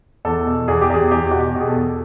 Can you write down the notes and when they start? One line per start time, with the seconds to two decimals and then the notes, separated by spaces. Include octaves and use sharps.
0.25 E2 A4
0.46 B2
0.68 E2 G#4
0.81 G4
0.90 E2 G#4
1.11 E2 G4
1.31 B2 F#4
1.40 G4
1.55 B2
1.61 G#4
1.68 A4
1.76 E2